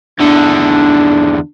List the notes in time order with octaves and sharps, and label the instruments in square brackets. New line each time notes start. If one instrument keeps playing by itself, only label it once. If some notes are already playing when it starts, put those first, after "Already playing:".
[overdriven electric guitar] E2 D3 [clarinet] D4